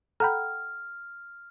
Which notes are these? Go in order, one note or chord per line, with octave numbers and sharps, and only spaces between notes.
A4 F#5 G5 A#5 B5 F6